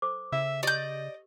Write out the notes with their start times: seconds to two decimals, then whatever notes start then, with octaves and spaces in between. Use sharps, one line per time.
0.02 A4 C5 D6
0.32 C#3 E5 E6
0.63 G4 D5 D#5 G6